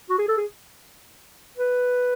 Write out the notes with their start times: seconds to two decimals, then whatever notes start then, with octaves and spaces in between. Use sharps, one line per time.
0.10 F#4
0.19 G#4
0.28 A4
0.37 G#4
1.57 B4